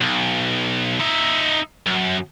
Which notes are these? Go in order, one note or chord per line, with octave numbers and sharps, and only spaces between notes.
B1
D#4 E5
F#2